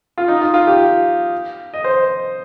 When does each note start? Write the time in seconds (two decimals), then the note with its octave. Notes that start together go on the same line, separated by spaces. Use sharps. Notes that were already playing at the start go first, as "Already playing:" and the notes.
0.18 F4
0.28 D#4
0.41 F4
0.54 F4
0.67 G4
1.74 D#5
1.84 C5